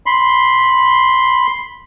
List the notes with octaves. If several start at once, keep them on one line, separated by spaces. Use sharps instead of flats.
B5 C6